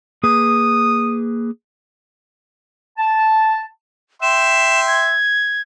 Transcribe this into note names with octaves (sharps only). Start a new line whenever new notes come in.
A#3 G#4 B4 D#6
A5
E5 G5 C6 E7
G#6